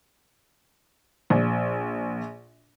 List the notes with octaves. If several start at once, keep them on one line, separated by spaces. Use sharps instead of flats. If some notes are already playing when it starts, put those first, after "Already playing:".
A#1